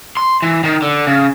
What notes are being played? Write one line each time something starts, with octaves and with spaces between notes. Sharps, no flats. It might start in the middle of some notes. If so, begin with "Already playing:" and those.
C6
E3
D#3
D3
C#3